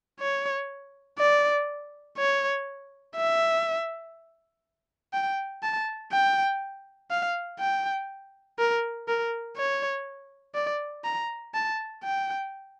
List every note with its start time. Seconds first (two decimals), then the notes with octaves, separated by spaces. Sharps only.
0.20 C#5
1.19 D5
2.18 C#5
3.16 E5
5.13 G5
5.63 A5
6.12 G5
7.11 F5
7.59 G5
8.59 A#4
9.08 A#4
9.57 C#5
10.55 D5
11.04 A#5
11.54 A5
12.04 G5